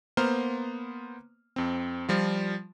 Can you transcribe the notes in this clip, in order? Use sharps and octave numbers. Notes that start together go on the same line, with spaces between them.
A#3 B3 C5 A#5 C6 F6
F2 C4
F3 G3 F4